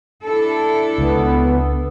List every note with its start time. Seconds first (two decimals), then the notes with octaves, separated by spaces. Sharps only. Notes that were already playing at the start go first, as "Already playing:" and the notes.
0.24 D4 E4 A4
0.98 C#2 B3